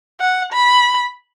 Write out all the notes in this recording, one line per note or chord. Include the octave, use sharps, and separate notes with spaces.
F#5
B5